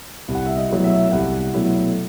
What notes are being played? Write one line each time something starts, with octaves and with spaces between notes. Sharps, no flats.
C2
F#5
E5
D#5
B2 F#3 A3 E4
E5
C2 F#5
B2 F#3 A3 E4